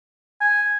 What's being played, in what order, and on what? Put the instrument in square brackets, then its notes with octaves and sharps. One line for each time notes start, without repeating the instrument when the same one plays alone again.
[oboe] G#5